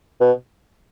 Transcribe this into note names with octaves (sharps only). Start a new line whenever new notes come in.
B2